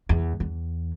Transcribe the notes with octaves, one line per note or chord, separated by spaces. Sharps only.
E2
E2